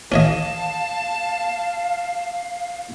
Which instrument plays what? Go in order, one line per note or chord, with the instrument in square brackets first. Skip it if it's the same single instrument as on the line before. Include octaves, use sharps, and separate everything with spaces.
[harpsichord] C#4 C#5 D#5 [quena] F5 [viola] A5